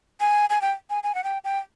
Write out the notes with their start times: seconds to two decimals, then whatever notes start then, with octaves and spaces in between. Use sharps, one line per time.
0.20 G#5
0.50 G#5
0.62 G5
0.90 G#5
1.03 G#5
1.15 F#5
1.24 G5
1.44 G5